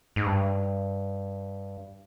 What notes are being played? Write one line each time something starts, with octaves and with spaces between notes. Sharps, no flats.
G#2
G2